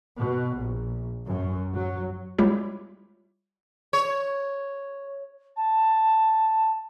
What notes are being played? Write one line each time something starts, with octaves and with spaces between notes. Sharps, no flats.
B2
A#1
F#2
F#3
G3 G#3 E4 F4 G4 C#5
C#5
A5